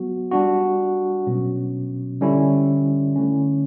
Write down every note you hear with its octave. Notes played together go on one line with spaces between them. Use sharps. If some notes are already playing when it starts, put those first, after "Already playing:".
Already playing: F#3 B3 F#4
G3 D4 F#4
B2 F#3 C#4
D3 G3 C#4 E4
D3 A3 C#4